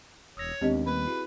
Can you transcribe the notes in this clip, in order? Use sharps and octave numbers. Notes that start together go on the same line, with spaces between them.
E1 C#5 D#6 E6 A#6
D#2 G#3 B3 C4 D4 G4 D#5
G3 A#3 B3 B4
E4 F#4 G#4